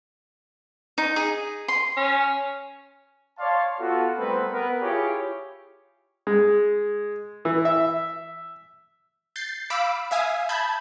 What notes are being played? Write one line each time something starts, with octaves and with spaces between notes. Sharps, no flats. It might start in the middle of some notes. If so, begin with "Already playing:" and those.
D#4
G#4
C6
C#4
C#5 D5 F5 A5 C6
B3 F4 F#4 A4
G3 A3 B3 C4 A#4 B4
B3 A#4 B4
E4 F4 G4 G#4 C#5
G#3
E3
E5
G6 A6 C7
F5 B5 D6 E6 B6 D7
E5 F5 G#5 D#6
A5 B5 G6 G#6